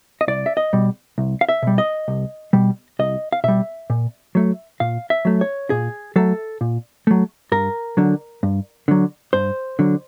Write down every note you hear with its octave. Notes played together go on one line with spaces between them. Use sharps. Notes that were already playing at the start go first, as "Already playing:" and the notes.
D#5
C2 D5
E5
D#5
B2 G3
C2
F5
E5
B2 G3
D#5
C2
B2 G3
C2 D#5
F5
B2 G3 E5
A#2
F#3 A3
A#2 F5
E5
F#3 A3
C#5
A#2 G#4
F#3 A3 A4
A#2
F#3 A3
G2 A#4
D3 F#3
G2
D3 F#3
G2 C5
D3 F#3